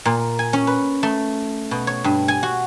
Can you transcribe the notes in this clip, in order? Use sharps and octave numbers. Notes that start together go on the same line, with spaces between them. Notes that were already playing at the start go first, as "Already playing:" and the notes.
A#2
G#5
C#4
B4
A3
B2
C#5
G2
G#5
F#4